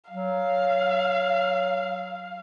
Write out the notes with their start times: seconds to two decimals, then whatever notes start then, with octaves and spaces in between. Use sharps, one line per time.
0.10 F#3 F5